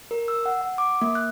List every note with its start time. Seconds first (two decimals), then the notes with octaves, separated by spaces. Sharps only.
0.11 A#4
0.28 E6
0.46 F#5
0.61 F#5
0.78 D6
1.02 A#3
1.15 F#6